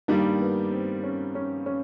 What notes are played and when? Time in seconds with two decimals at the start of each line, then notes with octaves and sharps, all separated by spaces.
0.08 G2 D#3 G3 A#3
0.40 B3
0.71 C4
1.03 C#4
1.35 C#4
1.66 C#4